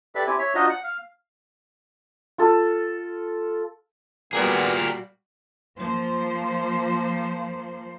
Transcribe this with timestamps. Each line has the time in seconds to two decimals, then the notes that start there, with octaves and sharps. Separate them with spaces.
0.15 G4 A4 B4 D5 E5
0.27 C4 E4 G4 G#5
0.39 C#5 E5
0.55 D4 D#4 F4 F#4 C5 D#5
0.69 F#5
0.84 F5
2.38 F4 A4
4.33 A#2 G3 A#3 B3 F4 F#4 G#4 A#4
5.77 F3 A#3 C5